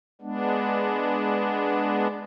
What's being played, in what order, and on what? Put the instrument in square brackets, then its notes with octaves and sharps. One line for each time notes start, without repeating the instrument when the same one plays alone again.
[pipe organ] G#3 B3 D4